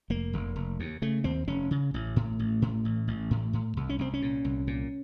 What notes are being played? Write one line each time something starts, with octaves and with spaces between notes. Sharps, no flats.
F1 A#3
F1
F1
D#2
C#3 A3
D#2 C4
F1 C#4
C#3
A1
A2
A1
A2
A1
A1
A2
A2
C2
C#4
C2 C4
C#4
A#2
C2
A#2